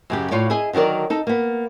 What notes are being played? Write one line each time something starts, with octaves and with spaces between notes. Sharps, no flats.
F#2 C#3 G4
A2 F4 C#5 D5
E4 G#4 D#5
D3 D#3 F#3 A#4 D5
D#4 A4
A#3 B3